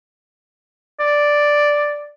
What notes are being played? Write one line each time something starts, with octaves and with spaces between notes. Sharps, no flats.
D5